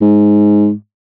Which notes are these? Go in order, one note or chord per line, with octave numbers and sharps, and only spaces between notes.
G#2